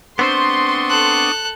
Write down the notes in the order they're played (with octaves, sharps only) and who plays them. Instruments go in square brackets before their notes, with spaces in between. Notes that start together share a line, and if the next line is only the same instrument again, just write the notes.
[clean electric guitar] B3 C4 C5 [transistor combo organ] D4 C#6 D#6 [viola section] C6
[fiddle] A4 F#6